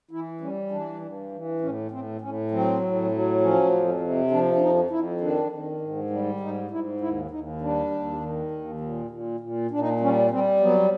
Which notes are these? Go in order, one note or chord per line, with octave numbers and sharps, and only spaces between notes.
E3 E4
G3 C#4
E3 D4
G2
E3
A2 C#4
A2 C4
A2 C#4
F#3 C4
A2
F#3
F3 C#4
F2
C3
F3 D4
D4
F2 D#4
F2 E4
D#3 D4
D#3
G#2
G3 D4
G#2 D#4
G#2 E4
D#2 E4
D#2 D#4
G3 D4
D#2
D#3
D#2
A#2
A#2
A#2
A#2 D4
D#4
D4
G3 C#4
G3 C4
F#3 B3